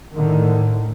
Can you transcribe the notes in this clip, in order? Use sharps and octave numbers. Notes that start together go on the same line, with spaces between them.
A2 D3 D#3